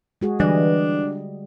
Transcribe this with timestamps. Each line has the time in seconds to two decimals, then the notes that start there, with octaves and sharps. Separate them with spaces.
0.22 G#3 F#4 G#4
0.40 D3 E3 G3 D4 D#5